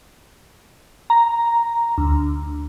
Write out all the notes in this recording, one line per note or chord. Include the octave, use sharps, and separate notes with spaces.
A#5
D2